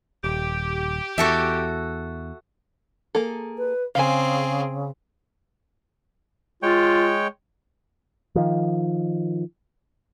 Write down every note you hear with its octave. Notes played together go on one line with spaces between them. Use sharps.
D#1 G4
E2 F#4 A4 E5
A#3 G#4 A4
B4
C#3 C4 G#4 F5 G#5
G#3 F4 C#5 G5
D#3 F3